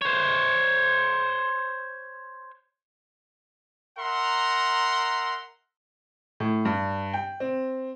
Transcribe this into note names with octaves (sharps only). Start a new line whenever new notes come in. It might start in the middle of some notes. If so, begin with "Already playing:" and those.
C5 C#5
A#4 E5 F#5 A#5 C6
A2
G2
G5
C4